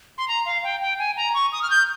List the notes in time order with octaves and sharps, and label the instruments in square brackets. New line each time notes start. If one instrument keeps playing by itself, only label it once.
[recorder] C6
A#5
F5
G5
G5
G#5
A#5
C#6
D#6
F6
G6